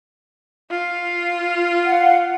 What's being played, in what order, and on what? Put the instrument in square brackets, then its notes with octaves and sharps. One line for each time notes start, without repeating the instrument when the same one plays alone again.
[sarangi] F4
[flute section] F5 F#5